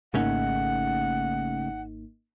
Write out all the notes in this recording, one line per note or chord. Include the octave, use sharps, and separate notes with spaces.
G#1 C#3 A3 A#3 C#4 D#4 F#5